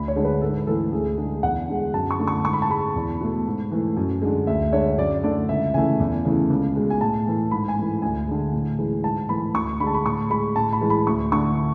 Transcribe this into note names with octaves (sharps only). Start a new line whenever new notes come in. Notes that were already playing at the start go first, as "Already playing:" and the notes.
Already playing: D2 B5
C#5
D3 G#3
B4
G#2 A4
E3 A3 A4
D2 G#4
D3 G#3 G#4
E2 F#5
D3 G#3
F#2 A5
C#6
D3 A3
C#6
G#2 C#6
B5
A5
G#3 B5
E2
B2 A3
G#2
E3 A3
F#2
D3 G#3
D2 E5
D3 G#3 C#5
F#2 D5
D3 A3 D5
C#2 E5
C#3 E3 A3 G#5
E2
C#3 E3 A3
C#2
B2 G#3
G#5
A2 A5
E3 A3
G#2 B5
G#5
E3 A3
D2 G#5
D3 G#3
A2
E3 G#3
G#2 A5
E3 A3 B5
D2 C#6
D3 G#3 A5 B5
B5
A2 C#6
G#3 B5
A2 A5
B5
E3 G#3
B5
D2 C#6
D3 A3 C#6